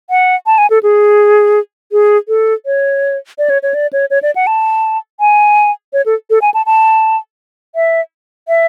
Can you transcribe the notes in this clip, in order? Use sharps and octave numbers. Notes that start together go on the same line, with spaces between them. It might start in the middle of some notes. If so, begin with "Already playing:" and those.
F#5
A5
G#5
A4
G#4
G#4
A4
C#5
D5
C#5
C#5
D5
C#5
C#5
D5
F#5
A5
G#5
C#5
A4
A4
G#5
A5
A5
E5
E5